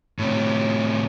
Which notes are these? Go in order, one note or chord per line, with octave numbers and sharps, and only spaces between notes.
A2 C3